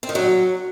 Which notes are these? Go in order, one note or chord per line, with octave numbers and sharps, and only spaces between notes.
C4
D#3
F#3